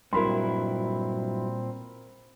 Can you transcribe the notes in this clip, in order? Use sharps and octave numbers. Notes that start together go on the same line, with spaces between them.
G2 A#2 F#3 C4 E4 A#4 B5 C6